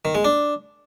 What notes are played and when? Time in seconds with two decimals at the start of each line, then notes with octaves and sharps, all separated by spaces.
0.05 D#3
0.15 G#3
0.25 D4